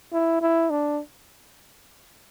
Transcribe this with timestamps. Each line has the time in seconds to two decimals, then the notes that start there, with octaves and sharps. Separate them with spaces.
0.13 E4
0.41 E4
0.70 D4